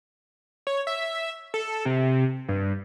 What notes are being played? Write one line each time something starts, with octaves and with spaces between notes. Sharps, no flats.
C#5
E5
A4
C3
G2